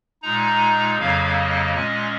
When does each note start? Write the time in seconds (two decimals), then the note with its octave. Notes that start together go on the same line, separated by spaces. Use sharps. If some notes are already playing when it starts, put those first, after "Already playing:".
0.22 A#2 G#3 D#4 A#5
0.99 F2 C#3 F#3 A#3 F5
1.36 D#5
1.74 A#2 G#3 C#4 D#5